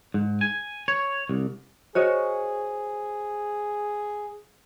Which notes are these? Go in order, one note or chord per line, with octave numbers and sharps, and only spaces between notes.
G#2
G#5
C#5
C2
F#4 G#4 C5 C#5 D#5